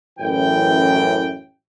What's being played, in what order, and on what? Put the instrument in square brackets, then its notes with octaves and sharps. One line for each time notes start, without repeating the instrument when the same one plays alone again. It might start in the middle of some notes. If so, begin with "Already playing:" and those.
[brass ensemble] A1 F#2 E3 G5